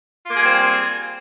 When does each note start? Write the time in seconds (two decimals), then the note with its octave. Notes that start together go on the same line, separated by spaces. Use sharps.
0.24 F4
0.29 A#3
0.34 G#4
0.39 G3
0.43 C4